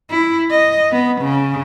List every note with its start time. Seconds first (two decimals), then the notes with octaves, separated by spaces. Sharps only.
0.10 E4
0.51 D#5
0.92 B3
1.22 C#3